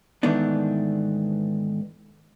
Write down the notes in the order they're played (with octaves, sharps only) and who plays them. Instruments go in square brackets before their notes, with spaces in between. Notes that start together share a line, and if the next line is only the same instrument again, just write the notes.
[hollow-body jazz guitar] G#2 D#3 E3 A3 B3 D4